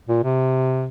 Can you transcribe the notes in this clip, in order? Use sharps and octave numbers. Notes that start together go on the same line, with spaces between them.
A#2
C3